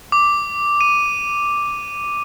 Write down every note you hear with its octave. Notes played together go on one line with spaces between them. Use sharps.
D6
D#7